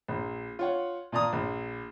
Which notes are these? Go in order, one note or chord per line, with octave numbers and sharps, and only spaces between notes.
A#1
F4 C#5 F#5
A#2 F4 D5 A5 A#5 D#6
A#1